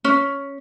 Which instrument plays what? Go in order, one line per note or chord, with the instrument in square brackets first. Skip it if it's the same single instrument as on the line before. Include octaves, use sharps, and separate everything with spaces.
[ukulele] C#4